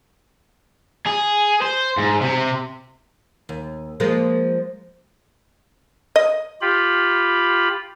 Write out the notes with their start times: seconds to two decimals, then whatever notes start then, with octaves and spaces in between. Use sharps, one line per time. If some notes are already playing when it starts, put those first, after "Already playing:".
1.07 G#4
1.62 C5
1.98 G#2
2.21 C3
3.49 D#2
4.00 F3 G#3 A#3
6.16 D#5
6.61 F4 G4 B5